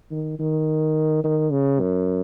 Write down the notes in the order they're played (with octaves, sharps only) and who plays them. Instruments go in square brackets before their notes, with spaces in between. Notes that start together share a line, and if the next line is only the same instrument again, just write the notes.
[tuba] D#3
D#3
D#3
C#3
F#2